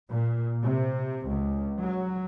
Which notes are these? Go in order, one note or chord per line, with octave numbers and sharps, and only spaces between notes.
A#2
C3
C#2
F#3